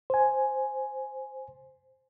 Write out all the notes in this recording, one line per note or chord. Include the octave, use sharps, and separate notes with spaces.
C5 G#5